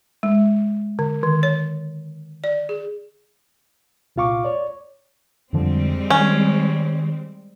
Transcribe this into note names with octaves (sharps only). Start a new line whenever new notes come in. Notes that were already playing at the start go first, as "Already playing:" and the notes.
G#3
D3
D#3
C#5
D5
G#4
C2 A#2 F4 F5 C#6 D6
C#5 D5
F2 D3 F3 G3 G#3 C4
D#3 C#4